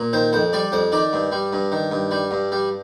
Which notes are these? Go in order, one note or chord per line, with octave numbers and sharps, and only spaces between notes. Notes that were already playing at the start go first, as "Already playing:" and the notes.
Already playing: A#2
D#3 C5
F2 C5
G3 D5
F2 C5
D#3 D5
G2
G3
G2
D#3
G2
G3
G2
G3